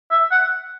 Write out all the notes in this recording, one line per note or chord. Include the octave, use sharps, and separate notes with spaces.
E5
F#5